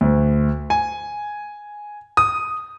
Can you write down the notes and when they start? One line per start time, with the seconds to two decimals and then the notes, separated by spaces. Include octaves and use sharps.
0.01 D2
0.70 G#5
2.17 D#6